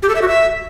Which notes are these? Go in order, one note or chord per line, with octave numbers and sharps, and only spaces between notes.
G4
A4
E5
F#4
E5